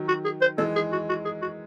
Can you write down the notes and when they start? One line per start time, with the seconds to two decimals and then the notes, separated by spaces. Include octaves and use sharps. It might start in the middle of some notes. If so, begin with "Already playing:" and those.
Already playing: D#3 F#3
0.08 F#4
0.25 G#4
0.41 C5
0.58 E3 G#3 A4
0.76 G#4
0.92 F#4
1.09 F#4
1.25 G#4
1.42 F#4